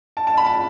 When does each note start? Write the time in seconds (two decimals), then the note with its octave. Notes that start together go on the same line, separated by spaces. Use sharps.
0.17 A5
0.27 A5
0.37 B5
0.46 A5